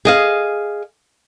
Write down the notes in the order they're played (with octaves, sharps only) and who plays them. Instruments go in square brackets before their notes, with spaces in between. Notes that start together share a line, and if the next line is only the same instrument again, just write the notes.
[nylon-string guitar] G#4 D#5 F5